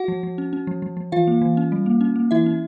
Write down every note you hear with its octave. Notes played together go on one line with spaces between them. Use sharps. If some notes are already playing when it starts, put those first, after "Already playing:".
Already playing: F#4 F#5
F3
F3
C#4
C#4
F3
F3
F3
E3 F4 F5
A#3
E3
C#4
G3
A#3
C#4
A#3
E3 E4 E5
C#4